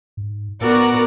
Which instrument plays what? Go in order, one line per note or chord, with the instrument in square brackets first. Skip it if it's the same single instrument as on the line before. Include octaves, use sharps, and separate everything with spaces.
[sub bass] G#2
[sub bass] A2 [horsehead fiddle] B3 A#4 [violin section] F#4 D5 A#5